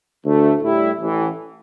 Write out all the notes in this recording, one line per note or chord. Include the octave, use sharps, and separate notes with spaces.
D2 D3 A3
A2 G3 E4
A1 A2 E3